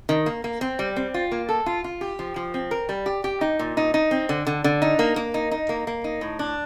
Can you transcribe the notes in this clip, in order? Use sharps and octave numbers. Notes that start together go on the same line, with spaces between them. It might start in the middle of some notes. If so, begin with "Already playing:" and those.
D#3
A#3
A#3
C4
G3
C4
F4
A#3
A4
F4
F4
G4
F3
F3
C4
A#4
G3
G4
G4
D#4
A#2
D#4
D#4
C4
D3
D3
D3
D#4
A#3
A#3
D#4
D#4
A#3
A#3
D#4
A2
D4